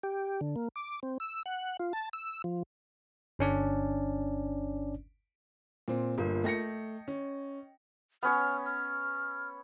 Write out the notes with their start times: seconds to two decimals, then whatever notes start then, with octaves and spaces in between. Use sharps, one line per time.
0.03 G4
0.41 D3
0.56 A#3
0.76 D6
1.03 C4
1.20 E6
1.46 F#5
1.79 F4
1.93 A5
2.13 E6
2.44 F3
3.39 G1 C#4 D4 D5
5.88 A#2 C4
6.18 G1 A#3 F4 A#4
6.44 A3 D#5 G5 A#6 C#7
7.08 C#4
8.23 B3 C#4 C#5 F6
8.66 F6